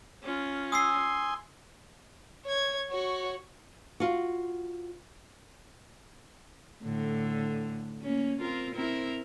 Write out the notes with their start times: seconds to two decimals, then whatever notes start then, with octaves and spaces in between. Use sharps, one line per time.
0.23 C#4 F4
0.72 G#5 C6 D#6 E6 C7
2.45 C#5 G#6
2.90 F#4 C#5
4.00 F4 F#4
6.83 A2 D3
8.02 A#3 C#4
8.40 C4 F4 A#4
8.75 C4 E4 A#4